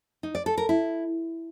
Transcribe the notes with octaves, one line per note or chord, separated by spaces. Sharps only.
D#4
D5
A4
A#4
E4